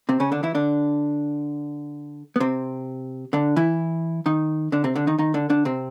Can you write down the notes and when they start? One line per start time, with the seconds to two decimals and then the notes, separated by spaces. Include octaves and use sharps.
0.09 C3 C4
0.20 C#3 C#4
0.32 D3 D4
0.43 E3 E4
0.55 D3 D4
2.36 B3
2.40 C3 C4
3.33 D3 D4
3.56 E3 E4
4.26 D#3 D#4
4.72 D3 D4
4.84 C3 C4
4.96 D3 D4
5.07 D#3 D#4
5.19 D#3 D#4
5.34 D3 D4
5.50 D3 D4
5.65 C3 C4